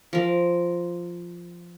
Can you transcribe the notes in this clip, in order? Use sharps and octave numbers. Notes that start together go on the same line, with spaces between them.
F3 A#4